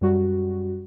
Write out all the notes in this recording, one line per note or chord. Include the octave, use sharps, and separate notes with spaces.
F#2 G3 F#4